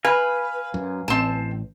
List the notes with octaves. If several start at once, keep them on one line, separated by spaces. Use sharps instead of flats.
B4 F5 G#5
F#2
A1 C4 A5